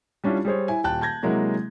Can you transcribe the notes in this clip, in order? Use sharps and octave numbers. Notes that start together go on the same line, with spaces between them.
G3 C#4 D4 E4 F4
G3 G#4 C5 C#5
E4 G#5
D#1 G5 A5 F#6
A5 G6 G#6 A#6
C3 F#3 G#3 A#3 E4